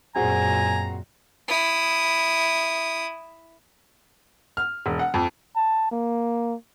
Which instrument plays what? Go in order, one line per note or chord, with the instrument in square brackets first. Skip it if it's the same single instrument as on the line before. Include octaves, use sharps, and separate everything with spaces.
[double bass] F#2 A#2 [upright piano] C4 F#4 G#4 [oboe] G#5 [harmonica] A#5
[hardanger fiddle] E4 D#6
[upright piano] F6
E1
F#5
F2
[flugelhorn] A5
A#3